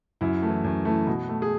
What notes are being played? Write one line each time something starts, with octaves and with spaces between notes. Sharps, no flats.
F#2 E4
E3 A3
F#2
E3 A3
B2
A3
G#4